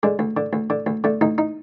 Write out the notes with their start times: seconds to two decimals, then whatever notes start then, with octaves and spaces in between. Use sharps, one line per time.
0.03 D3 G#3
0.19 D2
0.37 D3
0.53 D2
0.70 D3
0.86 D2
1.04 D3 A3
1.21 D2 D#4
1.38 D#4